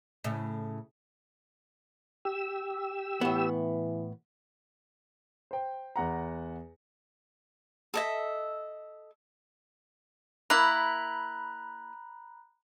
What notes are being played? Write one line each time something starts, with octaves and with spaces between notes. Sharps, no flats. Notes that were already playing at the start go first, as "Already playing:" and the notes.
A2 C#3
G4 E6
A2 E3 B3
C5 G5
E2 F#5 A#5
A4 D#5 E5
A#3 E4 A#5 B5 F#6